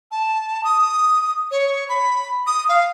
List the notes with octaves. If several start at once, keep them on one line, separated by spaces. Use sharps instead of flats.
A5
D#6
C#5
B5
D#6
F5